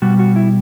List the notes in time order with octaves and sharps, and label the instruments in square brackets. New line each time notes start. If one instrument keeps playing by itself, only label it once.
[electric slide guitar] B2 G3 F#4
F#4
E4